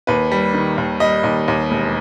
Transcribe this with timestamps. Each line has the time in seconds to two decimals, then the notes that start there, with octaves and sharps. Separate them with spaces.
0.07 D#2 B4
0.32 G3
0.54 D#3
0.78 D#2
1.00 G3 D#5
1.24 D#2
1.48 D#2
1.70 E1